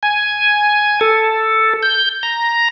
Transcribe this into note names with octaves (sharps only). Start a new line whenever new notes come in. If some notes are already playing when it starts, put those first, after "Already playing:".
G#5
A4
G6
A#5